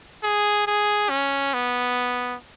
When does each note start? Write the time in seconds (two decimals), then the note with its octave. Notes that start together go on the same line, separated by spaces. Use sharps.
0.23 G#4
0.67 G#4
1.10 C#4
1.54 B3